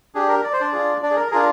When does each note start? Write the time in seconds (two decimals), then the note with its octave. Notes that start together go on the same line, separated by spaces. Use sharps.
0.15 D4 G4 G#4
0.28 A#4
0.44 D5
0.53 C5
0.61 D4 D5
0.72 D4 F4 G#4
1.02 D4 D5
1.11 G#4
1.16 A#4
1.31 D4 F4 G#4 A#4